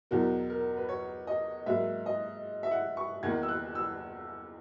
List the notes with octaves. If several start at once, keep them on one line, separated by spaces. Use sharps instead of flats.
E2 B2 F#3 A#4
A#4
B4
C#5
D#5
G#2 F#3 A#3 E5
D#5
E5
F#5
C#6
E2 D#3 A#3 G#6
E6
F#6
E6